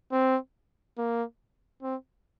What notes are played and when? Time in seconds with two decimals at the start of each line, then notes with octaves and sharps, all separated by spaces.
0.12 C4
0.98 A#3
1.82 C4